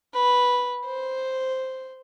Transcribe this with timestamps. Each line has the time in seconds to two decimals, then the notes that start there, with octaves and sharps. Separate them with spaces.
0.14 B4
0.86 C5